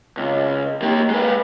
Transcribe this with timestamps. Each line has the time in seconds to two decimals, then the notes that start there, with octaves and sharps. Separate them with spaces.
0.17 C#2
0.82 A#3 G4
1.10 G#3 B4